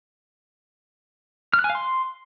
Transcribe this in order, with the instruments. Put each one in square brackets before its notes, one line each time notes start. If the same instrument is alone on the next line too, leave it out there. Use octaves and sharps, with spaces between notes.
[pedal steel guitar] F6
F#6
G#5
F5
C6